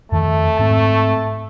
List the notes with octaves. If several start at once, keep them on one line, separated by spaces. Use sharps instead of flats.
F2 D#3 A3 A5
G#2 C4 A5